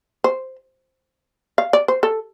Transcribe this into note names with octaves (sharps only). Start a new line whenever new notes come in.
C5
F5
D5
C5
A4